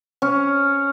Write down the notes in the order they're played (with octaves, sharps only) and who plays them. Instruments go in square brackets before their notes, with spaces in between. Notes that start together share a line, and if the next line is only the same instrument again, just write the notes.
[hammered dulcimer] C#4